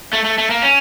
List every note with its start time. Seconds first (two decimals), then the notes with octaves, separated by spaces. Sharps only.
0.13 A3
0.24 A3
0.38 A3
0.50 A#3
0.62 C#4